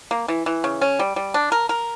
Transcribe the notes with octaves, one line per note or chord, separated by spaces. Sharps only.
A#3
E3
E3
C#3
C#4
G3
G3
D4
A#4
A#4